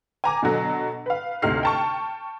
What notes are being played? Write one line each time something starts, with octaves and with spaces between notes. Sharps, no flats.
G#5 A#5 D6
B2 D3 F#3
B4 F5
D2 C3 D#4 F6 C7
G5 A5 C#6